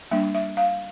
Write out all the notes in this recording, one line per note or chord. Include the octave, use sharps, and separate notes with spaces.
G3 A#3 D4 E5
E5
F5